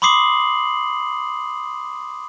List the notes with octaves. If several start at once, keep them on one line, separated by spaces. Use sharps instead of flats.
B5 C6 D6 D#6 C7 F#7